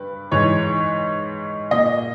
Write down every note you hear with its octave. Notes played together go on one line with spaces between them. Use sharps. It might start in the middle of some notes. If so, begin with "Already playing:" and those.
Already playing: G2 B4
G#2 E3 C#5
A#2 D#5